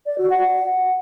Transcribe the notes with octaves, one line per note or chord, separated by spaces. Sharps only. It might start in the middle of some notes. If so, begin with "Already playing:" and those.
D5
F#4
F#5